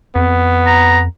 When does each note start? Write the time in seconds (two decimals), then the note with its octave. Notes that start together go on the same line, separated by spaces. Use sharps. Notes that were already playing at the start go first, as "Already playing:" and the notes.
0.16 F2 B3
0.67 A#5